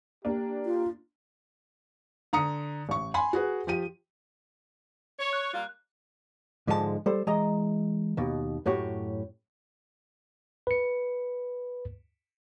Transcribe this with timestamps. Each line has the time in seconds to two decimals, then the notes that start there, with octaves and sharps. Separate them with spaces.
0.25 A#3 D4 G4
0.66 F4
2.33 D3 A#5 D#6 C#7
2.89 A1 C#6
3.14 G#5 B5 C6
3.33 F#4 G#4 B4
3.67 F3 G4 D#7
5.19 C#5
5.33 F#6
5.53 G3 A#3 F4
6.67 G#2 D3 F3 G#3 F4 A5
7.06 G3 A4 C5
7.27 E3 G#3 D#5 A#5
8.17 D#2 B2
8.66 F#2 A2 F#4 G4 C#5
10.67 B4 C#7